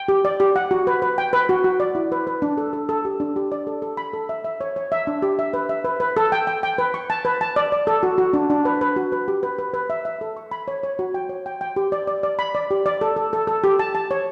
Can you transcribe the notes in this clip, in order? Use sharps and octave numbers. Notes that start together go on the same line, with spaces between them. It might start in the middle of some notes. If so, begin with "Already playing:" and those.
Already playing: G5
G4
D5
G4
F#5
F#4
B4
B4
G5
B4
F#4
F#4
D5
E4
B4
B4
D4
A4
A4
A4
G4
D4
G4
D5
A4
A4
B5
A4
E5
E5
C#5
C#5
E5
D4
G4
E5
B4
E5
B4
B4
A4
G5
G5
G5
B4
C#6
A5
B4
A5
D5
D5
A4
F#4
F#4
D4
D4
B4
B4
F#4
B4
G4
B4
B4
B4
E5
E5
A4
C#6
B5
C#5
C#5
F#4
G5
C#5
G5
G5
G4
D5
D5
D5
B5
D5
G4
D5
A4
A4
A4
A4
G4
A5
A5
C#5